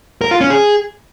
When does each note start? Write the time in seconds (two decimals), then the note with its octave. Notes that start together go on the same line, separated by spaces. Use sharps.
0.21 A#4
0.31 F4
0.41 C#4
0.50 G#4